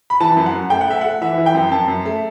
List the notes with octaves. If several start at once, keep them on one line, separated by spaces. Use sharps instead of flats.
B5
E3 A5
F#2
F#5
F#2
A3 G5
F#5
A3 E5
A3 F#5
E3 E5
E3
G5
F#2
F#2 A5
F#2
A3